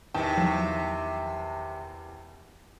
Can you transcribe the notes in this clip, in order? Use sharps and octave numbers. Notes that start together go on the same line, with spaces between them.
E2 C3 D#3 G5 A5
F3 F#3